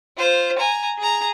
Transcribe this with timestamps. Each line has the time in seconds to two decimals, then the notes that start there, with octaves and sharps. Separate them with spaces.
0.17 F4 C5
0.58 G#5 A#5
0.98 G#4 A#5